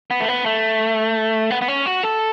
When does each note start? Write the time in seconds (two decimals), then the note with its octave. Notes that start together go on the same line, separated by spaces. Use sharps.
0.11 B3
0.20 A3
0.28 B3
0.46 A3
1.51 B3
1.62 B3
1.68 C#4
1.86 F#4
2.03 A4